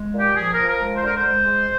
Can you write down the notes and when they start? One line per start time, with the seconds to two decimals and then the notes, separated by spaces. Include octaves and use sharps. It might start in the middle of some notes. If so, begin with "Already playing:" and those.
Already playing: G#3
0.14 A#2
0.19 G4
0.36 F3 G#4
0.52 A#4
0.57 F3
0.69 A#4
0.80 G#3
0.95 C5
1.02 D3 A#4
1.17 C5
1.24 G#3
1.45 G#3